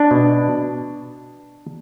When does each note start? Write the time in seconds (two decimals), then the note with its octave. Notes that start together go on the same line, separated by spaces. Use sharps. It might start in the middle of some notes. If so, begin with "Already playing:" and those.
Already playing: D4
0.11 B2